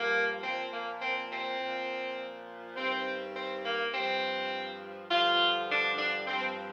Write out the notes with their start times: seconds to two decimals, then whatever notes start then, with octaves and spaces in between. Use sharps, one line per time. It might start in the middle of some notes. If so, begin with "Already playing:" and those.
Already playing: G2 F3 A#3
0.42 A#2 F3 C4
0.72 A#3
1.01 C4
1.31 C4
1.60 A#2 F3
2.76 G2 D#3 C4
3.36 C4
3.65 A#3
3.93 G2 F3 C4
5.10 G2 D3 F3 F4
5.70 D4
5.98 D4
6.27 G2 F3 C4